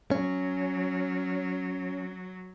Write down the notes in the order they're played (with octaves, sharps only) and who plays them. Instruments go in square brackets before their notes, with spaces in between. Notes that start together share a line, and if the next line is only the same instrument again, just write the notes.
[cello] F#3 [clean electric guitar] C#4